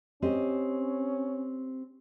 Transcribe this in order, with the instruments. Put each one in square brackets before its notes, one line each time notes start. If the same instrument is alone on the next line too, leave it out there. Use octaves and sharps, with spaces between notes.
[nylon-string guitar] C4 G4 D#5 [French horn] C#4